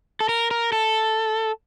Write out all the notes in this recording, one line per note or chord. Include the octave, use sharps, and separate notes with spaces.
A4
A#4
A#4
A4